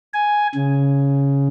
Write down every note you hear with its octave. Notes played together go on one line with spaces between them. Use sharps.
G#5
C#3